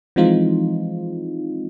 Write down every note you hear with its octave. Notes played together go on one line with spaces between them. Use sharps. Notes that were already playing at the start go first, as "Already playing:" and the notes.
E3 F3 G#3 C4 D#4 F4